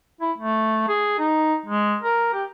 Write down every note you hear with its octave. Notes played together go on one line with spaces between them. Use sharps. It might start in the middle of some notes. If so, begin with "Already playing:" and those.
E4
A3
G#4
D#4
G#3
A#4
G4